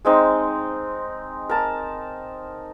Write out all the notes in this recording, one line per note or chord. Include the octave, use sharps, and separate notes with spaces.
G#3 C4 D#4
A#4 A5